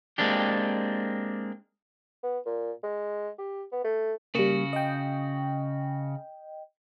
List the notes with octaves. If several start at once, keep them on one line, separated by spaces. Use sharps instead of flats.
G#3 A#3 C4 D4 G4
B3
A#2
G#3
G4
B3
A3
C#3 G3 A#3 F#4
D#5 G5